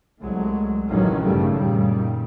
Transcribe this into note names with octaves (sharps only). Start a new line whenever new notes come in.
C2 F#3 G#3 A3
A1 F2 C3 D#3 F#3 C#4
G2 C#3 G3 A3
F#2 A#2 D#3 G3